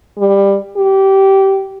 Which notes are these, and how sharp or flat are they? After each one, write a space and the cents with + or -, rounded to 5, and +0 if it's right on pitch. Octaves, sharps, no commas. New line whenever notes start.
G3 +15
G4 -20